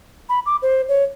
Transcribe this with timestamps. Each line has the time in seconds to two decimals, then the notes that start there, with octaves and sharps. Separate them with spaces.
0.29 B5
0.46 D6
0.62 C5
0.88 C#5